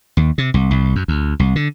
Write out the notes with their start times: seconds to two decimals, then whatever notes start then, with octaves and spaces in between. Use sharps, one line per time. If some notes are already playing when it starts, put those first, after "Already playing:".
0.17 D#2
0.38 C3
0.54 C2
0.71 C2
0.96 F#2
1.08 D2
1.39 C2
1.56 D3